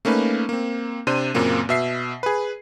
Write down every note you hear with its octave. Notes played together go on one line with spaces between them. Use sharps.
A3 A#3 C#4 D#4 B4
A#3 C4
C3 D4 C5 D#7
F#2 A#2 C#3 A#3 C4
B2 E5 C7
G#4 B4